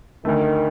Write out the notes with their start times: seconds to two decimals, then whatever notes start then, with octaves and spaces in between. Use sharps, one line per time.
0.25 D2 D3 D#3 A3